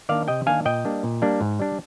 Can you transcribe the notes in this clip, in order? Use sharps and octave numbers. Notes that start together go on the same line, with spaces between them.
D#3 A#3 D4 D5 F5
C3 D#5 G5
D#3 A#3 D4 F5 G#5
A#2 D#5 G5
G3 A#3 D4
A#2
G3 A#3 D4
G#2
G3 D4